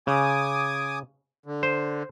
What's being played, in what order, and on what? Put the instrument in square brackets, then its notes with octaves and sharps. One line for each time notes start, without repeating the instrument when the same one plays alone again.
[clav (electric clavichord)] C#3 [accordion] G#5 D6 D#6
[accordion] D3
[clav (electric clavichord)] C5